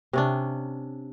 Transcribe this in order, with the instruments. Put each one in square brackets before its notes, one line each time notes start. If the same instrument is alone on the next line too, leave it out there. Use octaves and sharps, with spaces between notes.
[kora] C3 C#4 D4